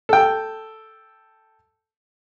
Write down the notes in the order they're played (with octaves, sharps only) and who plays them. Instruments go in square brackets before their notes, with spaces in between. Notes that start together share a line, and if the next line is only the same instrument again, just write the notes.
[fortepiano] A4 G5